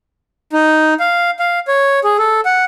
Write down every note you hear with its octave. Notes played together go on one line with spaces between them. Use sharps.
D#4
F5
F5
C#5
G#4
A4
F#5